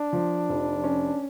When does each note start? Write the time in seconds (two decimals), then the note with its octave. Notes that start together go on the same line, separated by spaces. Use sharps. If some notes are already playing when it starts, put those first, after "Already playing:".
Already playing: D4
0.13 F3
0.49 F1
0.83 C#4